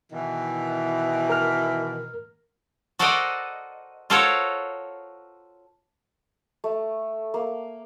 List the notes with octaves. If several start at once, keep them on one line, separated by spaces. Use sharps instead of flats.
B2 D#3 E3
A#4 F6
F#4 A4 A#4 C5 D5 D#5
F4 F#4 A4 A#4 C5 C#5
A3
A#3